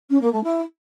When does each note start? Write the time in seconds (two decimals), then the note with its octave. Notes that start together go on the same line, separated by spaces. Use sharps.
0.10 C#4
0.21 A#3
0.32 A3
0.43 E4